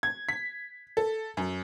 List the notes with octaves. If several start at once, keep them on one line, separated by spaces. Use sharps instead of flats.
G#6
B6
A4
F#2